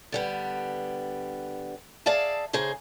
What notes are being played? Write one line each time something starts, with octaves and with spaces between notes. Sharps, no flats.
D3 G3 B3
G#4 D5 E5 F5 A5
C#3 D#4 G#4 C5